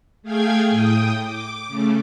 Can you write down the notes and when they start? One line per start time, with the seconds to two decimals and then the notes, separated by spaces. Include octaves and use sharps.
0.23 A3 G#4 F5 G5 G#5 G#6
0.69 A2 G5 D#6
1.22 D6
1.68 C#3 A3